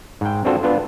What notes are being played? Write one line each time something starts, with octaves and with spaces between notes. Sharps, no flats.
G#2 G5
C4 D4 F4 F#4 A4 C5
B3 D4 F4